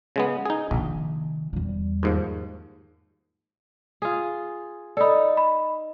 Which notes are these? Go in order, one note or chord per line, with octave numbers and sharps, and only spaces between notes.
C#3 G#3 B3
D#4 G#4
A#1 C3 D#3
E2 G3
D#2 G#2 F3
F4 G#4
D#4 A4 D5 B5
B5